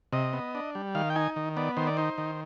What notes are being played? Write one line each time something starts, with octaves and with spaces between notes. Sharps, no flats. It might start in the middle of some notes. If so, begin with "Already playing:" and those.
C3 D#5
B3
D4
G3
D#3 F5
G5
D#4 G#5
D#3
B3 D5
D#3 C5
D5
D#4 C5
D#3